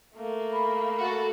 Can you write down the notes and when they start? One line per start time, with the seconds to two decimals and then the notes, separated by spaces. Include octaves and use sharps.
0.15 A3 A#3
0.53 B5
0.97 F#4 A4